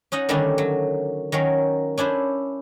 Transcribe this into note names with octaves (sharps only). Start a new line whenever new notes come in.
C#4 D#4 D#5 F#5
D3 D#3 G3 A3 C#4 D4
F#3
D#3 F#3 C#4 A#4
C#4 D4 E4 C5